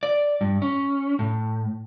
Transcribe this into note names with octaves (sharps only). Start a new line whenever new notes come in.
D5
G2
C#4
A2